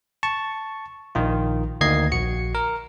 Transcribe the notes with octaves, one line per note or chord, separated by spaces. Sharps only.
A5 C#6
A#1 D#3 F4
D2 D#3 A#3 D#5 G#6 C7
A#1 F#4 C#7
A#4